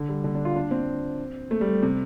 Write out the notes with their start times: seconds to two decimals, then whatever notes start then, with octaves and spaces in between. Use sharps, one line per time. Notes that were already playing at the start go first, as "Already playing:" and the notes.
Already playing: D3
0.09 G3
0.24 D3
0.35 D4
0.45 F4
0.56 D4
0.71 C4
1.51 A3
1.61 G3
1.83 C3